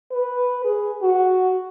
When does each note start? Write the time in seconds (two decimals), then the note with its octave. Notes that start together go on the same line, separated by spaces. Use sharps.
0.12 B4
0.65 G#4
1.02 F#4